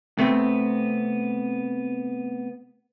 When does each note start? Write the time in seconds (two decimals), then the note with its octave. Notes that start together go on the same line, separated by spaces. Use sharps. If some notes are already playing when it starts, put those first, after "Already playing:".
0.19 C3 A3 B3 C4